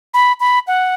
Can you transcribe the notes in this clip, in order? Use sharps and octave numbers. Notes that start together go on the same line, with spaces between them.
B5
B5
F#5